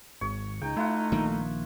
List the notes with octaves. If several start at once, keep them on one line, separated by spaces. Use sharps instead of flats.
G#1 C#5
C#2 D#4 G5
A3 E4 F4 F#5
A#1 D#3 A#3